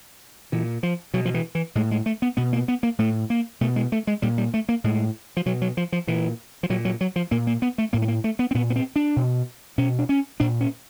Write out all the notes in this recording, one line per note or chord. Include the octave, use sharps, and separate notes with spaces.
A#2 E3
F3
B2 F#3
F3
E3
E3
A2 G#3
G#3
A3
B3
B2 B3
A#3
B3
A#3
A2 A3
A#3
B2 A3
G#3
A3
G#3
A#2 G3
G3
A3
A#3
A2 G#3
F3
B2 F#3
F#3
F3
F3
A#2 E3
F3
A#2 F#3
F#3
F#3
F3
A#2 A#3
A#3
B3
A3
A2 A#3
A3
A#3
A3
B3
C4
A#2 B3
B3
C4
D4
B2
B2 C#4
D4
C#4
A#2 D4
C#4